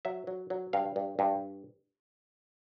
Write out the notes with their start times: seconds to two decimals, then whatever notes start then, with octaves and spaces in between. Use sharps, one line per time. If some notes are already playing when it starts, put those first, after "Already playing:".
0.05 F#3 E5
0.27 F#3
0.50 F#3
0.73 G2 F5
0.96 G2
1.19 G2